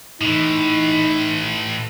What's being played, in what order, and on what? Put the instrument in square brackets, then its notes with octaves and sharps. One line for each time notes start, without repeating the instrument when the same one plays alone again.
[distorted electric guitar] A2 E3 [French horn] D#4